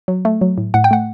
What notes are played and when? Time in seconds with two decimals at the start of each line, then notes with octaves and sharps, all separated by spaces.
0.08 F#3
0.25 A3
0.41 F#3
0.58 A2
0.74 A2 F#5
0.84 G5
0.91 A3 F#5